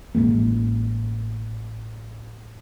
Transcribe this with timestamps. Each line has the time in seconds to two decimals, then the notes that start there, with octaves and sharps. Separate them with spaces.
0.15 A1 D3 G#3 A#3